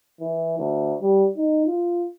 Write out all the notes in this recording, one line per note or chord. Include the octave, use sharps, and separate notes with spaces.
E3
D2
G3
D#4
F4